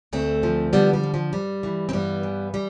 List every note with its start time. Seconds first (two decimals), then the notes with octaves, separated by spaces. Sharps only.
0.13 D2 A3 C4
0.43 F3
0.73 D3 G3 B3
0.93 G3
1.03 F3
1.14 F3
1.33 G2 G3
1.63 E3
1.89 C4
1.93 G2 G3 B3
2.23 E3
2.54 G3